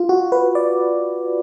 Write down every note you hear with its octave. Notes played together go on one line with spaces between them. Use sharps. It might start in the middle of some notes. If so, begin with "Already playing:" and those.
Already playing: F4
F#4
B4
D5